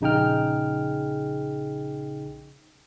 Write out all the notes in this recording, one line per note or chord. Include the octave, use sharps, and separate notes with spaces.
A#1 C#3 D#4 G#4 G5 F6